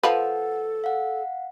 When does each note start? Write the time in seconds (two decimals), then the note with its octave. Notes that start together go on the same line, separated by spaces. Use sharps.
0.03 F3 A4 B4 F#5
0.84 F5 F#5